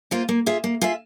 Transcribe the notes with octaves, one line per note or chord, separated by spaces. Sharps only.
A#3 F4 C5
A#3
F4 G#4 E5
A#3
F4 G#4 E5